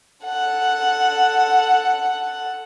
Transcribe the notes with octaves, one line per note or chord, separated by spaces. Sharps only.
A4 F#5